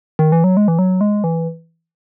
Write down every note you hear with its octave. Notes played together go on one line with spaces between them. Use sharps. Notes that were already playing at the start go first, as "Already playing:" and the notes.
D#3
E3
F#3
G#3
E3
F#3
G#3
E3